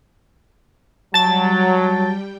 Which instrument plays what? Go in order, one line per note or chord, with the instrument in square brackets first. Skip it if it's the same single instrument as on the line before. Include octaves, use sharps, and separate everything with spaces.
[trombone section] F#3 [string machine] G3 G5 [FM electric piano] A5 A6